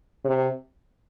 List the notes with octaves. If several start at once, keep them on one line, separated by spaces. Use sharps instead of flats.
C3